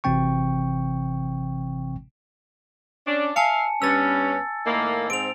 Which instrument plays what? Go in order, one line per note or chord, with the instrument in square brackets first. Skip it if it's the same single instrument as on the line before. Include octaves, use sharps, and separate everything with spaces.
[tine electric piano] G#1 C3 E3 C4 G5 C#6
[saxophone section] C#4 D4
[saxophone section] E5 F5 [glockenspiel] G#5 A5 C#7
[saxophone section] G2 B3 C#4 [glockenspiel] E6 A6
[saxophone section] A2 D#3 A#3
[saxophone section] G#2 C4 [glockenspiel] D7 F7